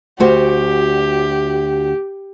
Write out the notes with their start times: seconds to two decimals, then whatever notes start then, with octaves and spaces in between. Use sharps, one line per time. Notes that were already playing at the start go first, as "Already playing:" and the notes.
0.20 D2 F#4 G4 C5